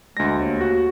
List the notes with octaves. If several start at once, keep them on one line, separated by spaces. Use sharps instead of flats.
D2 G#3 A#6
D#2
F#4